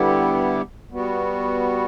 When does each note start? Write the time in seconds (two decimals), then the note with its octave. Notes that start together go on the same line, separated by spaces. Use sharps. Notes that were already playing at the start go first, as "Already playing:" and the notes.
Already playing: D3 G3 B3 E4 G4
0.91 G3 B3 F#4